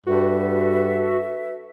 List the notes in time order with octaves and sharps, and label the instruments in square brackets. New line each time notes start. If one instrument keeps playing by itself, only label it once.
[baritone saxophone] G2 [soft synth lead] F#4 [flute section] A4 B4 E5